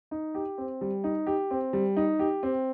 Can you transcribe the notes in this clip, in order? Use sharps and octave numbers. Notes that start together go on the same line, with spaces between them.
D#4
G4
C4
G3
D#4
G4
C4
G3
D#4
G4
C4